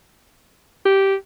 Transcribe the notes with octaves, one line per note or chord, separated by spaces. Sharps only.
G4